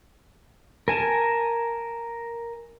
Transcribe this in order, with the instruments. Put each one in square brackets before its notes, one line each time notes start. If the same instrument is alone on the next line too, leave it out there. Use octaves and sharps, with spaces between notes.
[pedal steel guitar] A#4 G#5 A5